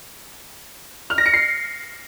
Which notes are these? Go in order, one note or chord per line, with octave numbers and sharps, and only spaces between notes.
F6
A#6
C#7
C7